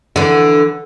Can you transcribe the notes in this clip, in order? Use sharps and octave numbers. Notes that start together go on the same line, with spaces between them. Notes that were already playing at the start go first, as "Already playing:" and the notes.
D3 E3